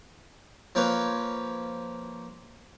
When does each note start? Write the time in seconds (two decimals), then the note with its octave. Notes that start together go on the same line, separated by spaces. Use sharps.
0.75 F3 A#3 B4 C#5